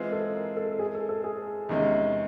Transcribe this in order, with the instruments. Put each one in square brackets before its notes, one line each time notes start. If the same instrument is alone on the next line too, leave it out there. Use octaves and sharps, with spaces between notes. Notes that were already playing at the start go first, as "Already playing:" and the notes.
Already playing: [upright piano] E3 G#3 C4 F4 G#4
[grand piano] A4
A#4
A4
G#4
A4
A4
G#4
[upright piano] E2 C3 D#3 G#3 C#4 [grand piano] D#4